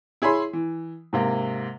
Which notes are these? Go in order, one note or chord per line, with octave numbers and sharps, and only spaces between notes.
E4 G#4 C#5 B5 C6
E3
G#2 C3 A#3